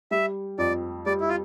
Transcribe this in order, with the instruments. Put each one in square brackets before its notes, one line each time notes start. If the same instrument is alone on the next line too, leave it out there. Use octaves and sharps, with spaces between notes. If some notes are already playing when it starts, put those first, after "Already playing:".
[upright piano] G3 [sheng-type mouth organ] E5
[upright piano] F2 [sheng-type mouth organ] D5
[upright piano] G3 [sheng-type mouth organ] D5
[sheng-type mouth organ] E4
F4